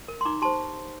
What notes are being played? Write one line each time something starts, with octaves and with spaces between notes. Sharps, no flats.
A#4
C6
D#4 A#5 D6
G4 C5 A5 C6